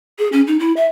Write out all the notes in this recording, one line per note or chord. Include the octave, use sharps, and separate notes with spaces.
G#4
C#4
D#4
E4
E5